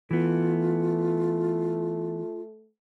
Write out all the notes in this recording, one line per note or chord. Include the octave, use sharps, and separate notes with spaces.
E3 A3 B3 F4